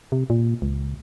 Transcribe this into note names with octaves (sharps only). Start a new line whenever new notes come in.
C3
A#2
C#2